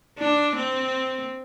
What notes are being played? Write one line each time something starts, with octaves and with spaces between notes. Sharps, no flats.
D4
C4